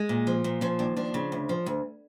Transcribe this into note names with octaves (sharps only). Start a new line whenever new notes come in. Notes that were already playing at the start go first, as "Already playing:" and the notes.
Already playing: G#3
A#2
F3
A#2
F3 C#4
D#2 D4
F3 D4
C#3
D2
F3
D2